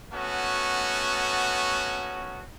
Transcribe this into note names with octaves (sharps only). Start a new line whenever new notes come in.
A3 B3 C#4 F#4